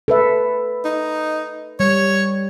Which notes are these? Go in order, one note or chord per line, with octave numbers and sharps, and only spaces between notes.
A4 B4 E5
D#4
G3 C#5